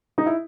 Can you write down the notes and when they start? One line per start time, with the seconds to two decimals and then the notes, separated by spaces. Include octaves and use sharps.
0.18 D#4
0.26 E4